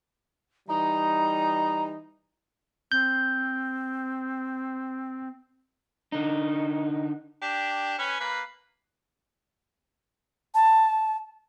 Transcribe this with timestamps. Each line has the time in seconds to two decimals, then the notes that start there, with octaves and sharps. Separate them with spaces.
0.68 E3 G3 D#4 A#5
2.92 C4 G6
6.12 D3 D#4
7.42 D4 G4
7.99 C#4 B4 G#5
8.20 A#3 B4
10.55 A5